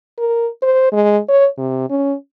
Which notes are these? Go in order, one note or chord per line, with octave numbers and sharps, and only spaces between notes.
A#4
C5
G#3
C#5
C3
C#4